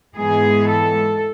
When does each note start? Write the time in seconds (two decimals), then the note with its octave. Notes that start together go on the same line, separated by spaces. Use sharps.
0.15 G#2 E3 G#3 B3 G#4
0.67 A4